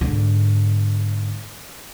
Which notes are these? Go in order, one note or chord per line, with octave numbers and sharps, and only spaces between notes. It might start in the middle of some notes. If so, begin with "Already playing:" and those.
G#2 D3